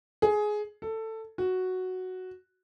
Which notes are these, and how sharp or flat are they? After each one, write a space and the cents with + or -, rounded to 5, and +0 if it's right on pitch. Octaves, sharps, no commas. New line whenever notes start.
G#4 +15
A4 +15
F#4 +0